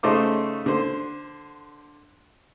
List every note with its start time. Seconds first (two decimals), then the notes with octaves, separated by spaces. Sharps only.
0.03 C#3 A3 D#4 C5 D6
0.66 D3 C5